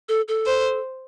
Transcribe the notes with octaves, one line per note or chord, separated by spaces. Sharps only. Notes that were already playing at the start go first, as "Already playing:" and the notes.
A4
A4
C5